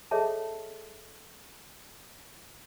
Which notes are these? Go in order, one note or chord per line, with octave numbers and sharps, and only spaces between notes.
G#4 A4 C#5 D#5 E5 A5